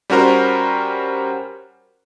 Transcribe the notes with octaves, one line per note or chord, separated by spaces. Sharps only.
G3 C#4 F#4 A#4 C5